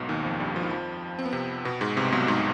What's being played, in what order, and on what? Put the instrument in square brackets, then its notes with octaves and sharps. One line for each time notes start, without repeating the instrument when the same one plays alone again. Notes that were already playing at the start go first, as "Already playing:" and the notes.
Already playing: [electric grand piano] B1 G#2 B2
D#2 D#3
F2 F3
G2 G3
F3
D#3
F2 F3
C4
B3
C3 C4
B2 B3
G#2 G#3
C2 C3
B1 B2
G#2